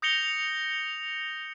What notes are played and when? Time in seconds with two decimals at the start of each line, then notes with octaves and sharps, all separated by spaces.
0.02 D#6 G6 A#6 C#7 F7 G7